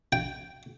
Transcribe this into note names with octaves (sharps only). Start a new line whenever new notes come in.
G5